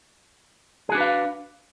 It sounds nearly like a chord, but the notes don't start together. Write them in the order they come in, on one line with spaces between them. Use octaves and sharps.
G#4 F#4 D4 B4 F5